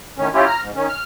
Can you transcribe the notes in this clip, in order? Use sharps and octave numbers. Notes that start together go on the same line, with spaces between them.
A2 D#3 C#4
C#4 E4 F4 G4
A#5 F6
G#2
D#3 C#4
F6